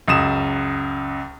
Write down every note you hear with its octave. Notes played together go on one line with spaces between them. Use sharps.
C#2 F#2 D#6 E7